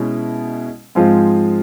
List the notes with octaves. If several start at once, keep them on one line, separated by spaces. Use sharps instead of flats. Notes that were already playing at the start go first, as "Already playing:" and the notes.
Already playing: B2 G#3 C#4 E4
G#2 F3 G#3 C4 F4